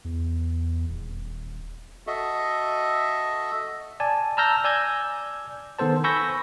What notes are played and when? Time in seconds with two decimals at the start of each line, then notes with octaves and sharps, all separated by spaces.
0.04 E2
0.89 D#1
2.07 F#4 A4 D#5 E5
4.00 D5 G#5 A5
4.37 A5 A#5 E6 F6 G6 A#6
4.64 D5 G#5 E6 G6 G#6
5.79 D#3 B3 A4 C5 A5
6.04 G#5 B5 C#6 E6 G6 A#6